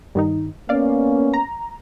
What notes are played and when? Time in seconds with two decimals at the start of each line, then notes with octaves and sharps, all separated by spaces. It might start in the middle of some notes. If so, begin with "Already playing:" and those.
0.15 G2 D#3 D#4
0.69 A#3 B3 C#4 D5 F5
1.34 A#5